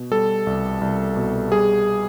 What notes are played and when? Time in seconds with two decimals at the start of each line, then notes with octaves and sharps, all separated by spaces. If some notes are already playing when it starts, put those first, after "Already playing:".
Already playing: B2
0.11 G3 A4
0.47 C2
0.81 C2
1.16 B2
1.52 G3 G#4